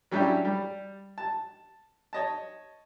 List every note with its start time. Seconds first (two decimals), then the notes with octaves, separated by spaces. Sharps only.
0.11 F#3 G3 C#4 D4 E4 G4
0.45 G3
1.18 A5
2.13 C#5 D#5 A5